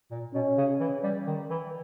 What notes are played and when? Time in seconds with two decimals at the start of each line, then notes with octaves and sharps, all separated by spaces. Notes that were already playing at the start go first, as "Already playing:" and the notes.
0.11 A#2
0.34 B2 C#4
0.58 C#3
0.80 E3
1.03 G3
1.27 D#3
1.50 E3